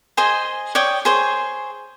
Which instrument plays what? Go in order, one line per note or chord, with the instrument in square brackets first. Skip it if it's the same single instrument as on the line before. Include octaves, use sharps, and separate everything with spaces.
[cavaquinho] G#4 C5 D#5 G#5
C#5 D5 G5 D#6
G#4 C5 C#5